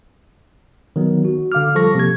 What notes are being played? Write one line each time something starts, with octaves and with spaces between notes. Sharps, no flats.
D#3 F#3 B3
F#4
D3 F5 D6 F6
F3 G3 A4 C#6 A#6
C3 A#3 G#6